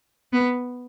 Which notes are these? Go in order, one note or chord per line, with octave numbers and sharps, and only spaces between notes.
B3